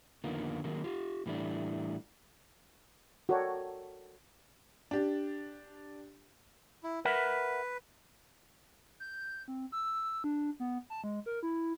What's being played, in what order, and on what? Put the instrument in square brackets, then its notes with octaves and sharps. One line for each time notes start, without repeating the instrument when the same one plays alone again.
[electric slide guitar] F2 D3 D#3 A#3 B3 F4
D#3 F#3 G#3 A#3 C4
F4 G4
A2 E3 G3 A3 D4
[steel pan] F#4 A4 A#4 C#5 D5 G5
[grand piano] D4 G4
[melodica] E4
[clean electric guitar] A#4 E5 F#5 [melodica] B4
[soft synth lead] G6
C4
E6
D4
B3
A5
G#3
A#4
E4